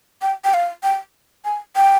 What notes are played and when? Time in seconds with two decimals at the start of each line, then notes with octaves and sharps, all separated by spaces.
0.22 G5
0.44 G5
0.54 F5
0.83 G5
1.45 G#5
1.76 G5